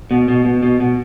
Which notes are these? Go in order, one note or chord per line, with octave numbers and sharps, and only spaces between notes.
B2
B2
B2
B2
B2